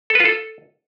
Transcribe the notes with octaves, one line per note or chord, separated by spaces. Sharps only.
A4
B4
F4
A4